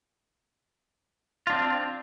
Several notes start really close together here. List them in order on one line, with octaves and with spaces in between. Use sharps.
F4 D4 C4